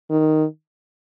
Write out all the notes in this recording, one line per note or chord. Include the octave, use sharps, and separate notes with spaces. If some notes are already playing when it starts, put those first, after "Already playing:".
D#3